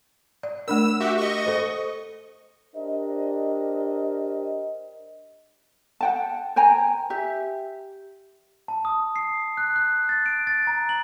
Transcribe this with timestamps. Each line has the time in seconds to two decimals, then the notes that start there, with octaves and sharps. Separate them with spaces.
0.43 D5
0.68 A3 D4 A#4 E6
1.00 F#4 G4 E5
1.18 D#5 C#6
1.46 A4 C5
2.76 D4 G4 A#4 C5 D#5
6.01 F#5 G5 A5
6.56 C5 G5 G#5 A#5
7.10 G4 E5
8.68 A5
8.85 D#6
9.16 C7
9.57 F#6
9.76 F#6
10.09 A6
10.26 D7
10.47 A6
10.67 A#5
10.89 F#7